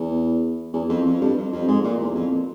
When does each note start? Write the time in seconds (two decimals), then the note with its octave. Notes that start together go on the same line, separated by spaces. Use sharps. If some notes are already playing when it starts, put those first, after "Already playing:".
Already playing: E2
0.73 E2
0.89 F2
1.05 F2
1.21 G2
1.36 F2
1.53 F2
1.68 G#2
1.84 A#2
2.00 E2
2.15 F2